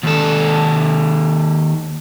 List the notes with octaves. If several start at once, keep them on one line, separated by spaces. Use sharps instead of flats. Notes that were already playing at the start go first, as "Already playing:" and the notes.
D#2 A4